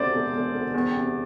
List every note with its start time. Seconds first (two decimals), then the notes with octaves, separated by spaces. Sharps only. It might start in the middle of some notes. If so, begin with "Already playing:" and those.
Already playing: E1 D2 C3 C5 D5
0.12 E1
0.32 E1
0.53 D2
0.74 E2
0.94 C3